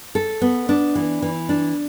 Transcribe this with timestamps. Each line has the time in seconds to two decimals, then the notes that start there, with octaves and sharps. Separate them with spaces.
0.15 A4
0.41 B3
0.69 D4
0.95 E3
1.22 E3
1.49 D4